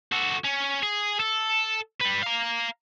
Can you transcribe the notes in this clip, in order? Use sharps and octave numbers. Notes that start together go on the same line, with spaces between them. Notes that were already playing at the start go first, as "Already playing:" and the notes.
F#4 A4
C#4
G#4
A4
G3 B4
F5 A#5